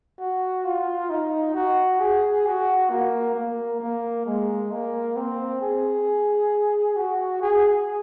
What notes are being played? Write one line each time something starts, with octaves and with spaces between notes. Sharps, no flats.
F#4
F4
D#4
F#4
G#4
F#4
A#3
A#3
A#3
G#3
A#3
C4
G#4
F#4
G#4